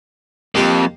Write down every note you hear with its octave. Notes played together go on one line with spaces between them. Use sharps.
F2 A#3 G4 D#5